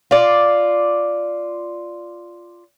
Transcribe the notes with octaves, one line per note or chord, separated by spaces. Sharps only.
F4 D5